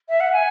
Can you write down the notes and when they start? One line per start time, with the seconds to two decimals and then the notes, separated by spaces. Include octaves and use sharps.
0.09 E5
0.20 F#5
0.32 G#5